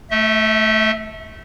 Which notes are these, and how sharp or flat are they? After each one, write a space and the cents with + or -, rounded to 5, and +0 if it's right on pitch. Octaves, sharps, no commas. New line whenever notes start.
A3 +0 E5 -40